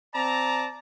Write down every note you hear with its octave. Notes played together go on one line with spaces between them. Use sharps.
C4 D5 A5 A#5